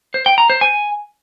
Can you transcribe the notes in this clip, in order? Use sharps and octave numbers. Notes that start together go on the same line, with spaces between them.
C5
G5
A#5
C5
G#5